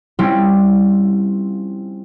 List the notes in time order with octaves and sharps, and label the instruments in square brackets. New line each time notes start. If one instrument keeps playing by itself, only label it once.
[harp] G3 C4 C#4 E4 F4